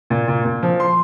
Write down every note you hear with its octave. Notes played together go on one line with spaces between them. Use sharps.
A#2
A#2
A#2
F3
C6